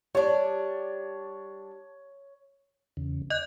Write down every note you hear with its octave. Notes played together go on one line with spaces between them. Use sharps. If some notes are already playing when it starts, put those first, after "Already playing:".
G3 D4 C#5
E2 C#3
D5 D#5 F#6 G6